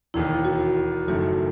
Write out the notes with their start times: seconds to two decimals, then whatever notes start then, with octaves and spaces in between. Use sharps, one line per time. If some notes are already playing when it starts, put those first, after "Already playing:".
0.14 E1 D#2 D#3 E4
0.35 E4
0.45 F#4
1.08 F#1 F#2 D#3 A3 F#4